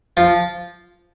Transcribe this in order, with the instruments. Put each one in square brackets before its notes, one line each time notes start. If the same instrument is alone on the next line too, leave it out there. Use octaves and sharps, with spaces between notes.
[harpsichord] F3 F4